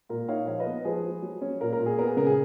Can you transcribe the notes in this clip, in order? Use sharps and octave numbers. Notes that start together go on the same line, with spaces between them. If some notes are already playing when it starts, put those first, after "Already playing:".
A#2 A#4
D#4 C#5 F5
F3 C#5 F5
B4 D#5
B3
F3 G#4 B4
F3
F#3
C#4
A#2 A#4
A#4
A#2
G#4
B3 A#4
G#4
C#3 A#4
G#4